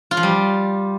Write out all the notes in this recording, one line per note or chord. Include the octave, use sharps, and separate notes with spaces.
F4
F3
G3